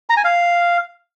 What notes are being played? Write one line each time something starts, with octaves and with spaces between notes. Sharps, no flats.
A#5
G#5
F5